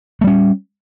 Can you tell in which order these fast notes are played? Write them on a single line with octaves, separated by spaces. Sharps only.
A3 G3 C#4